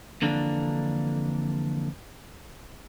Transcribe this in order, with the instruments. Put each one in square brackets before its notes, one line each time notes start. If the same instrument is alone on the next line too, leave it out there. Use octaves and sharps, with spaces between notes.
[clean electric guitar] F2 D3 E3 A#3 D4